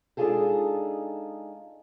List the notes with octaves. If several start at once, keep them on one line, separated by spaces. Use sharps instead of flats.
G#3 D4 D#4 F4 G#4 A4